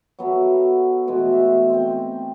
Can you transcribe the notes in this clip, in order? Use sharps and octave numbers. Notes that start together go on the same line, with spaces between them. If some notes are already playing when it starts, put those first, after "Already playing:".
F#3 B3 A4 E5
B2 E3 G#3 A3
E5
C4 D#5 G5